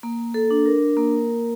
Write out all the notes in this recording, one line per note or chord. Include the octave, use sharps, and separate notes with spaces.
A#3
A4
D4
A#4
A#3